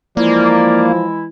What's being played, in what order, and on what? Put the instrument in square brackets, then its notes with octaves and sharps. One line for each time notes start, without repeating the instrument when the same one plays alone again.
[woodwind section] E3 G#3 E4 [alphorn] F3 [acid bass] A#3 [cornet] D5